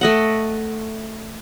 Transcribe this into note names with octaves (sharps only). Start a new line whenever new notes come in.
A3 D#5 F#5